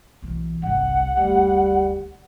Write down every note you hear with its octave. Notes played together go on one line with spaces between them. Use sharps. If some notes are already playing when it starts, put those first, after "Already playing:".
B1 E3
G1 C2 F#5
F#1 D2 G3